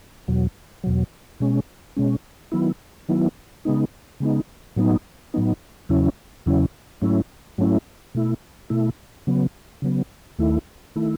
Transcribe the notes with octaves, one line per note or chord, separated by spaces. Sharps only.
E2 B2 F#3
E2 B2 F#3
B2 G#3 C#4
B2 G#3 C#4
D#3 F#3 B3 E4
D#3 F#3 B3 E4
C#3 G#3 B3 D#4
C#3 G#3 B3 D#4
A2 F#3 B3 D#4
A2 F#3 B3 D#4
E2 C#3 F#3 C#4 E4
E2 C#3 F#3 C#4 E4
G#2 F#3 A3 C#4 E4
G#2 F#3 A3 C#4 E4
B2 A3 E4
B2 A3 E4
C#3 F#3 B3
C#3 F#3 B3
D#2 D#3 A3 E4
D#3 A3 E4